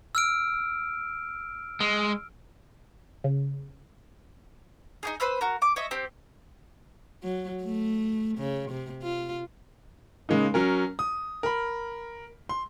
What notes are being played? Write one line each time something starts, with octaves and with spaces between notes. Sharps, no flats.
E6 F6 D7
G#3
C#3
D#4 G4 G#4
B4 C5 B5 E6
F#4 A#4
D6
C#5 D#5 E5
C4 G4
F#3
A3
C#3
C3
F4
C#3 G#3 A#3 D#4
F#3 C#4 A#4
D#6
A#4 B5
C6